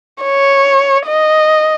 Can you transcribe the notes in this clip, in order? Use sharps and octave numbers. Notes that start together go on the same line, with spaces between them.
C#5
D#5